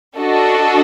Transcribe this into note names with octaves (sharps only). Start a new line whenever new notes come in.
D4 F#4 A4 D#5